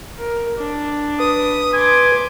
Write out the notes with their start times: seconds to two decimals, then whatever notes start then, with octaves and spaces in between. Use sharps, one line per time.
0.18 A#4
0.58 D4
1.20 B4 D#6
1.74 G#5 C6 D6